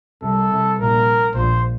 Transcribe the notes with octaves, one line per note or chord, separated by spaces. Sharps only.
C2 C3 A4
C2 C3
A#1 A#2 A#4
A#1 A#2 C5